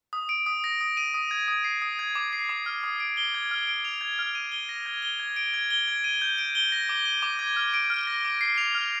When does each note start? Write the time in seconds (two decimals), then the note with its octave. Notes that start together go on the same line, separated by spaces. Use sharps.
0.13 D#6
0.29 D7
0.46 D#6
0.64 A#6
0.81 D#6
0.97 D#7
1.14 D#6
1.31 G#6
1.48 D#6
1.64 C7
1.82 D#6
1.99 G#6
2.15 D6
2.33 C7
2.49 D6
2.66 F6
2.84 D#6
3.00 D7
3.17 G7
3.34 G#6
3.51 F6
3.67 D7
3.85 F7
4.01 G#6
4.19 F6
4.35 D#7
4.52 G7
4.69 A#6
4.86 G#6
5.02 G7
5.20 G#6
5.36 D7
5.54 G#6
5.70 G7
5.88 G#6
6.04 D#7
6.22 G6
6.38 D7
6.55 G7
6.72 A#6
6.89 D6
7.05 D#7
7.22 D6
7.39 G#6
7.56 F6
7.74 D7
7.90 F6
8.07 A#6
8.25 D6
8.41 C7
8.58 F7
8.75 F6